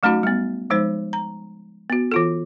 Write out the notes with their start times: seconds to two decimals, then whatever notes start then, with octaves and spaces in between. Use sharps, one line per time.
0.03 F#3 A3 C#4 D#4 F#4
0.23 G3 B3
0.70 F3 G#3 D#4 C5
1.13 A#5
1.90 B3 F#4
2.12 E3 F4 A4